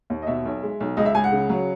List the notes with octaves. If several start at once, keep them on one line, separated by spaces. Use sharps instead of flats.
D#2
D#5
B2 E5
B1
G#3
B1
C#2 D#5
E5
C#2 G#5
F#5
C#3
F#3